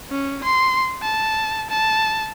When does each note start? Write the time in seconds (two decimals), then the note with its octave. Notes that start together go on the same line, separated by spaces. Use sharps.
0.11 C#4
0.44 C6
1.03 A5
1.70 A5